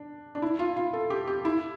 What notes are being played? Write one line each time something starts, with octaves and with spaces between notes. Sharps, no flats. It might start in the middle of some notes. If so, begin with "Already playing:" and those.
Already playing: D4
D4
E4
F4
F4
A4
G4
G4
E4